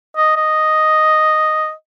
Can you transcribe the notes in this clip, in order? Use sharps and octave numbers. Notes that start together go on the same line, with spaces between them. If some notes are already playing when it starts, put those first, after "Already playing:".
D#5
D#5